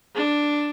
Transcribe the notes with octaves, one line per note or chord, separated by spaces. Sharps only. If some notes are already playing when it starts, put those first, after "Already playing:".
D4